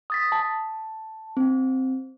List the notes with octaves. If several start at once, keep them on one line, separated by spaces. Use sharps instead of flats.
D#6 A6 B6
A5
C4